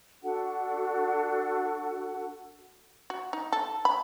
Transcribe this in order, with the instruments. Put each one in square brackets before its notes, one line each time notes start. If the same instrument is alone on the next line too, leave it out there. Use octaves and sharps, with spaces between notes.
[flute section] D4 F#4 A4 F#5
[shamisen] F#4
D#4
A4
B5